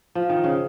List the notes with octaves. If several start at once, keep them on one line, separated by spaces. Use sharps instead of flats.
F3
D#3
C#3